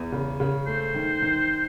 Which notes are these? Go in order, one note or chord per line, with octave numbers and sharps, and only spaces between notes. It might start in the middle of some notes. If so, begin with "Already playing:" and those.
Already playing: E2
C#3
C#3
A3 C5
D#3
D#3